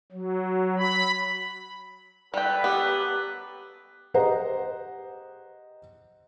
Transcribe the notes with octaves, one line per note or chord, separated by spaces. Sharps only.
F#3
B5
F#2 G3 A4 B4 G5
B3 G4
G4 G#4 C5 D#5 F#5 A#5